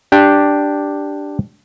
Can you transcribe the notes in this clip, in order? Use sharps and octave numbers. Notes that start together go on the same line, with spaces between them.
D4 G4